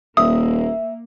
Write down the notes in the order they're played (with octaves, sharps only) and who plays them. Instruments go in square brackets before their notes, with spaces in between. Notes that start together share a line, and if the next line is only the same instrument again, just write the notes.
[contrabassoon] D#1 [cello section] A#3 [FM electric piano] E5 [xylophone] D#6